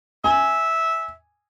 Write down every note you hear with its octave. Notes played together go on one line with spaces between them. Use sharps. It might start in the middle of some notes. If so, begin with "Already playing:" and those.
E5 G#5